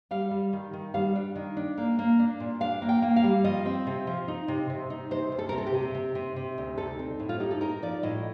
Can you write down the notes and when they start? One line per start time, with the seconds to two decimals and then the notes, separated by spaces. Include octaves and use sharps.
0.11 G3 F5
0.31 G3
0.53 D#3
0.73 D#3
0.94 G3 F5
1.16 D4
1.35 D#3
1.57 D4
1.77 A#3
1.99 A#3
2.19 D4
2.40 A#2
2.61 D4 F5
2.82 A#3
2.89 G5
3.02 A#3
3.16 F5
3.24 G3
3.44 F3 D#5
3.65 C4
3.87 C3
4.07 F3
4.28 D#4
4.48 C3
4.70 C3
4.90 D#4
5.11 C3 C5
5.32 D2
5.39 A4
5.49 A#4
5.53 C3
5.58 A4
5.67 G4
5.74 C3
5.95 C3
6.15 C3
6.36 C3
6.58 D2
6.77 D#4 A4
6.99 C4
7.19 A2
7.29 F4
7.40 D#4 G4
7.51 A4
7.61 D#4 A#4
7.82 F3 D5
8.03 A2 D#5